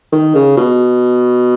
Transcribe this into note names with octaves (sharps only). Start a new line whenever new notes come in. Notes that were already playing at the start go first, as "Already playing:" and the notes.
D#3
C#3
B2